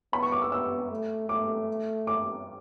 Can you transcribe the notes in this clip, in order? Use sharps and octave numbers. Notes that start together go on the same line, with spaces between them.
B3 B5
C#6
D6
E6
B3 E6
A3
A3 D6
D6